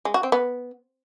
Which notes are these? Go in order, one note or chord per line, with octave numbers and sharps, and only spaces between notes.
G#3
F#4
C4
B3